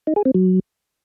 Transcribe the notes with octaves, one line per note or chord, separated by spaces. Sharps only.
D#4
G#4
C4
F#3